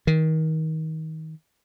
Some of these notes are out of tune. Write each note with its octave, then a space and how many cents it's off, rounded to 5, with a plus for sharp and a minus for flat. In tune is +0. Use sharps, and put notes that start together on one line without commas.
D#3 +30